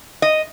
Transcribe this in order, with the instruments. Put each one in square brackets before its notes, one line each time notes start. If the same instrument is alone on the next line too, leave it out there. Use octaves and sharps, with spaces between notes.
[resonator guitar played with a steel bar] D#5